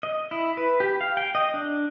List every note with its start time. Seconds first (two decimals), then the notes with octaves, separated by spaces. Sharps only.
0.03 D#5
0.31 E4
0.57 B4
0.80 G4
1.01 F5
1.17 G5
1.35 D#5
1.54 D4